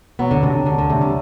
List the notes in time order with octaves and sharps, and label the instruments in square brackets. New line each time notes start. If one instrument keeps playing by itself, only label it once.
[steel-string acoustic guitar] B2 B3 [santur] F#3
[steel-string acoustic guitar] D2 D3
[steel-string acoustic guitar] C3 [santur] D4
[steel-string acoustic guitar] D2 D3 [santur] D4
[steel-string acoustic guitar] D2 D3
[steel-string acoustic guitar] C3 [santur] A3
[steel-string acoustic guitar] G3